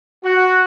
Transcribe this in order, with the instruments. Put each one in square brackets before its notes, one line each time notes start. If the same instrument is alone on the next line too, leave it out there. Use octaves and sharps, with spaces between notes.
[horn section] F#4